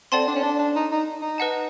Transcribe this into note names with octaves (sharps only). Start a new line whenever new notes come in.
C4 A4 D5 F#5 A5 C6
D4
C#4
D4
D4
D#4
D#4
D#4
B4 D#5 F#5 A5